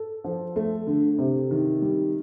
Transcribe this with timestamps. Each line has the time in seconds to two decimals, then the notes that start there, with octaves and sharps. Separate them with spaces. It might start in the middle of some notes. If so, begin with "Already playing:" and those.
Already playing: A4
0.24 F3
0.56 A3
0.87 D3
1.18 C3
1.51 D#3
1.82 G3